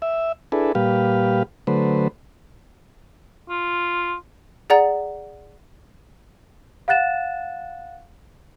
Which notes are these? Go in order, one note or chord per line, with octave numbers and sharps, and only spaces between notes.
E5
D4 E4 G#4 A4 B4
A#2 G3 G4 B4 F5
D3 F#3 A3 B4 C5
F4
G#4 D5 F#5 A#5 A6
F5 F#5 F#6 A6 E7